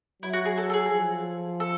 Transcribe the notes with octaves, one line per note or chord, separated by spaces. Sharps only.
F#3 E4
F#4
G#4
A4
A4
G#4
F3
A4